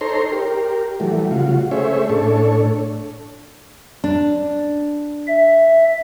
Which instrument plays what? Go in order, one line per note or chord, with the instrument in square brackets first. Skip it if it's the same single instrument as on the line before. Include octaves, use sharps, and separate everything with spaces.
[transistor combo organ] D#4 A4 C5 C#5 A#5 C6
G4 A#4
E3 F#3 G3 A3
C#3 F4 F#4
A3 C#4 G#4 C5 C#5 E5
A2 D4 A4 C#5
[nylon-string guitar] D4
[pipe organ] E5